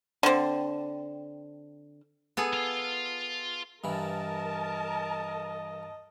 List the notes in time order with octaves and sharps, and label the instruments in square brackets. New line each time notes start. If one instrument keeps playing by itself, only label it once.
[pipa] D3 C4
[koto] B3 G#4 A4
[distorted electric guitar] F4 F5
[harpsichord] G2 E3 B5 [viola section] A#4 A5 [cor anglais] D#5